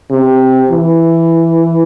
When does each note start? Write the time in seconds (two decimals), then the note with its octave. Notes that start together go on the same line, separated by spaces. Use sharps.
0.11 C3
0.71 E3